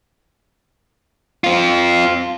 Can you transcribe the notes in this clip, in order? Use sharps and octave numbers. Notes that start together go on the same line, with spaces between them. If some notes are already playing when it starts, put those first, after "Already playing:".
C4 F4